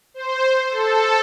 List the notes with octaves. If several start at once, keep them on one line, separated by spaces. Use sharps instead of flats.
C5
A4